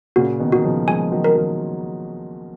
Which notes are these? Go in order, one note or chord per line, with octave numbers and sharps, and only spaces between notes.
A#2 C#3 F#4
B2 D#3
D#3 F#4
C#3 F3
F3 G#3 G#5
D#3 F#3
A#4
D#3 F#3